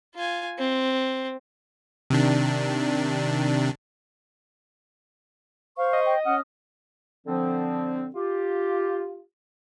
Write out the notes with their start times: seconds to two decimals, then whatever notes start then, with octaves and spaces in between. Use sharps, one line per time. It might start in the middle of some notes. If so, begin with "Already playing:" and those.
0.15 F4 G#5
0.59 C4
2.10 C3 D#3 D4
5.78 C5 F5 C#6
5.93 D#5
6.06 G5
6.25 C#4 F#5 D#6 F6
7.27 D3 F3 C4
8.15 F4 G4